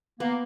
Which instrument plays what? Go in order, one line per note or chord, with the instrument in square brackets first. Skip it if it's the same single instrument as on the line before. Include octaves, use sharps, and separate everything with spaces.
[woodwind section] A#3 [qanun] B3